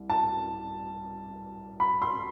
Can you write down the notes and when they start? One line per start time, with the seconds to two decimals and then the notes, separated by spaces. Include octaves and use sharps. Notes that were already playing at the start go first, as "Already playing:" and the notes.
Already playing: C2
0.10 A5
1.80 B5
2.02 C6